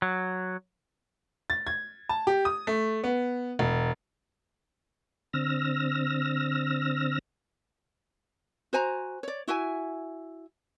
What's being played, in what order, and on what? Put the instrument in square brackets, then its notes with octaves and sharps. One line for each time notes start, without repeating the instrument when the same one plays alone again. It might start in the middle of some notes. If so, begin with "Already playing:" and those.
[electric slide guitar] F#3
[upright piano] A6
G#6
A5
G4
D#6
A3
B3
E1
[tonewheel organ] D3 C4 E6 F6 A#6
[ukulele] F#4 C5 G#5 A#5
C#5 D5
E4 F#4 E5 G#5